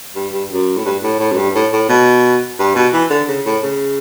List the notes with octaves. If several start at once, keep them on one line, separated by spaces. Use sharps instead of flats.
G2
G2
F#2
A2
G2
A2
A2
F#2
G2
A2
A2
B2
G2
B2
E3
D3
C#3
A2
C#3